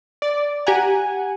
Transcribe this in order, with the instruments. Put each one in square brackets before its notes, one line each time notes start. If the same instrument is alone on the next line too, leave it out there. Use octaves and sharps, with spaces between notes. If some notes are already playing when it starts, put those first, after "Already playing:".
[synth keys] D5
[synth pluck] G4 A#5 [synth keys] F#5 G#5